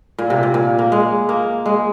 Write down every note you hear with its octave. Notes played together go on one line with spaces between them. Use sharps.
A#2
C3
A#2
A#2
A#3
G#3
A#3
G#3